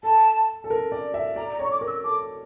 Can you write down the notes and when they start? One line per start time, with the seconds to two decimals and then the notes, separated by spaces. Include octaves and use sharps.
0.03 A4 A5
0.64 A4
0.70 A#4
0.92 D5
1.14 E5
1.36 D5 A#5
1.53 A#5
1.60 C#5 C#6
1.70 D6
1.81 A#4
1.87 E6
2.03 A4 D6